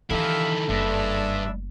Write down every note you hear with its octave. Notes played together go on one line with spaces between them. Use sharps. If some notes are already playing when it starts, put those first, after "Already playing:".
D#3 E3 D4 E4 G4 A4 E5 F5
F#1 G2 G#3 D4 E5